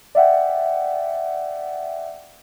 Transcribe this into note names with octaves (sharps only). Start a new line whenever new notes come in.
D5 E5 F#5 G5